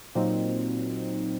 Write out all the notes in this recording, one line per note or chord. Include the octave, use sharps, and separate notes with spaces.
A#2 F#3 C4 D#4